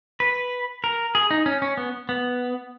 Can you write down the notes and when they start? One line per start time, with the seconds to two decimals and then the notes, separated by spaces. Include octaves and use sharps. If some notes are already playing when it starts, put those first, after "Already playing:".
0.20 B4
0.84 A#4
1.15 G#4
1.31 D#4
1.46 C#4
1.62 C#4
1.77 B3
2.09 B3